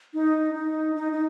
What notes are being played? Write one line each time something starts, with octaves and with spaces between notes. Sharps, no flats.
D#4
D#4
D#4
D#4